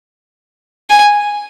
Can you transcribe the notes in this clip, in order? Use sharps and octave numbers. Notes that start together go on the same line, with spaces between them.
G#5